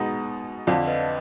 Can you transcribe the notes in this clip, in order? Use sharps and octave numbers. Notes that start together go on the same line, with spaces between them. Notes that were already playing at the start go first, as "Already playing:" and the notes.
Already playing: B2 G#3 B3 D#4
F2 D3 F3 D5 F5
B4 D#5